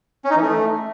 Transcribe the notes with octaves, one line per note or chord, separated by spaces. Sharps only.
C#4
D#4
E3
A3